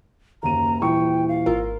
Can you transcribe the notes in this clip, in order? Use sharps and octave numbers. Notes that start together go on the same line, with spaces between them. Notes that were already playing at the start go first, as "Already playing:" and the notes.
F#1 D#2 A#5 D#7
D#1 E3 G5 C#6
F5
G#1 F4 A#4 E6